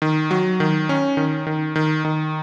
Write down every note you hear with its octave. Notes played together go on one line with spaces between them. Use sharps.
D#3
F#3
D#3
C#4
D#3
D#3
D#3
D#3